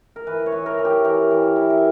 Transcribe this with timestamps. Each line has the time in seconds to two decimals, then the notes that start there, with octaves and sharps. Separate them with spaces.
0.16 A#4
0.27 E3 B4
0.46 C#5
0.52 E3
0.66 A#4
0.79 E3
0.85 G4
1.04 E3 A#4
1.31 E3
1.56 E4
1.70 A#4